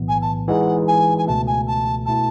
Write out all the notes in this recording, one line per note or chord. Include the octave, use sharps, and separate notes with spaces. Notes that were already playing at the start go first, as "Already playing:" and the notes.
Already playing: B1 A2 E3 B3
G#5
A5
E3 G#3 D#4 G#4 F#5
G#5
G#5
C#2 B2 A3 A5
G#5
A5
B2 A3 E4 A5